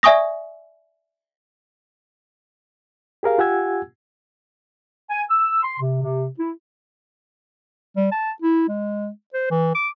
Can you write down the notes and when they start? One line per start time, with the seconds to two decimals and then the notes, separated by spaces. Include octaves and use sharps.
0.03 D5 E5 G#5 C#6 D#6 A#6
3.23 G4 G#4 A#4 F5
3.38 F4 G4 F#5 G#5 E6 G#6
5.10 G#5
5.30 E6
5.63 C6
5.80 C3
6.03 C3
6.39 E4
7.96 G3
8.12 A5
8.42 E4
8.69 G#3
9.34 C5
9.50 E3
9.75 D6